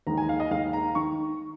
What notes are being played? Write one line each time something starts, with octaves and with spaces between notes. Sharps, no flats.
D#2 D#3 G#3 D#4 A#5
G#5
F5
D#5
D#2 D#3 G#3 D#4 F5
A#5
D#3 C#6